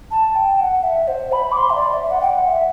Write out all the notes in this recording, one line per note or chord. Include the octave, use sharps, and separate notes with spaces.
A5
G5
F#5
E5
C5
B5
D6
C6
E5
D5
E5
E5
F#5
G5
F#5
E5